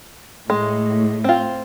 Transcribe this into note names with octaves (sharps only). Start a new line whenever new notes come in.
A2 G#3
C4 F4